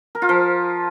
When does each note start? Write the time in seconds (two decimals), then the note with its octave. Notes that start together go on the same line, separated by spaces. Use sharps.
0.15 A#4
0.22 F4
0.29 F3